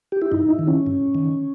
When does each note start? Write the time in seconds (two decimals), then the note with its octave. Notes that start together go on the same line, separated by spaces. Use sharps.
0.12 G4
0.22 E4
0.32 G2 D#4
0.50 E4
0.59 D#3
0.68 C#4
0.86 G2
1.15 D#3